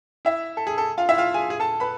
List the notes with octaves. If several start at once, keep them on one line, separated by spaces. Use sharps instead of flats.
E4 E5
A4
G#4
A4
F4 F5
E4 E5
F4 F5
G#4 G#5
G#4 G#5
A4 A5
B4 B5